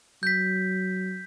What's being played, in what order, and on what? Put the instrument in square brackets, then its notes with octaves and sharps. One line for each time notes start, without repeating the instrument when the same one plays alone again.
[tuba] F#3 [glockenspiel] G6 B6